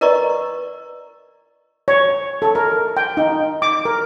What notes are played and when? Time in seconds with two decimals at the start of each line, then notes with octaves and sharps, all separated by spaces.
0.01 A#4 B4 D5 D#5 A#5 C#6
1.88 C#5
2.42 A4
2.55 A#4
2.97 G5
3.17 D#4
3.62 D6
3.85 A#4